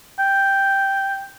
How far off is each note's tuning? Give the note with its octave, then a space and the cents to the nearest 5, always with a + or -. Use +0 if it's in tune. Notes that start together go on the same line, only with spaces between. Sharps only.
G5 +0